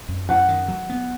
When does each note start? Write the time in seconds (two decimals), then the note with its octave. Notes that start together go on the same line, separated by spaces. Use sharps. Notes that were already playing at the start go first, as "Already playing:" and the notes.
0.09 F#2
0.29 F#2 F#5
0.48 D#3
0.68 F#3
0.90 B3